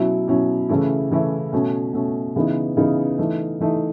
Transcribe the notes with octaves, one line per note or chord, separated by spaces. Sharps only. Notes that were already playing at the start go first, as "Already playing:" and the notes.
Already playing: B2 F#3 C#4 E4
B2 F#3 C#4 E4
C#3 E3 A3 C#4 E4
C#3 E3 A3 C#4 E4
B2 A3 C#4
B2 A3 C#4
C#3 E3 B3 D#4
C#3 E3 B3 D#4
E3 A3 D#4
E3 A3 D#4